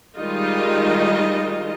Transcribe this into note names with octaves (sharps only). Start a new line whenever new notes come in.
D#3 G3 G#3 D#4 F4 D#5